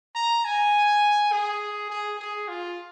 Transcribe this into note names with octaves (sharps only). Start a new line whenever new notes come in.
A#5
G#5
G#4
G#4
G#4
F4